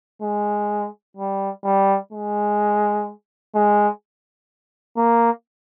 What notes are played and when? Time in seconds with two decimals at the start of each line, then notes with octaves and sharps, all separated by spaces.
0.22 G#3
1.17 G3
1.65 G3
2.12 G#3
3.55 G#3
4.97 A#3